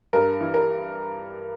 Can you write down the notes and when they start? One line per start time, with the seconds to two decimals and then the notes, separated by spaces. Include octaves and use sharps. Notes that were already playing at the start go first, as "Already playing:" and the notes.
0.13 G2 A#4
0.41 E3
0.54 A#4